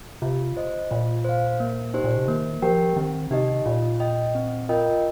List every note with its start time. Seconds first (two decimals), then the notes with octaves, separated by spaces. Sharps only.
0.22 C3 F4
0.57 C5 D#5
0.91 A#2 F4
1.25 C5 F5
1.60 A#3
1.94 D#4 G4 C5
2.04 A#2
2.17 C3
2.28 D#3 A#3
2.62 F3 G4 A#4 G5
2.96 D#3 C4
3.31 C3 D#4 G4 D#5
3.66 A#2 F4
4.00 D#5 G5
4.35 C4
4.69 F4 A#4 D#5 G5